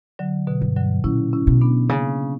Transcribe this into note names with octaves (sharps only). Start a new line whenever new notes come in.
D3 F#3
B2 D3
G2
D3 F#3
A#2 C#4 E4
C#4 E4
B2
B3 D4
C#3 A#3 C#4